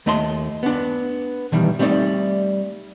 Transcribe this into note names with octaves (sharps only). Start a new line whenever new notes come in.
D#2 A3 D#5 A5 C6
B3 D4
B2 D#3 E3 G3
G3 A3 C4 D#4 D5